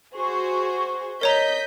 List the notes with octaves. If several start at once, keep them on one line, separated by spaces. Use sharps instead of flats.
F#4 G#4 C5 C#6
A#4 C#5 D#5 A#5 G6 B6